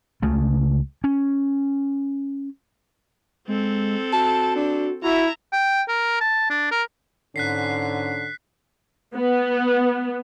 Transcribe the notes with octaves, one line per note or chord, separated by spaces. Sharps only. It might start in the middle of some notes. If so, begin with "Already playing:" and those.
C#2 C#3 A3
C#4
G#3 C4 A4
F#4 A5
D4
E4 F#4 E5 A#5
G5
A#4
A5
D4
A#4
G#2 D3 C#4 F#6 B6 C7
B3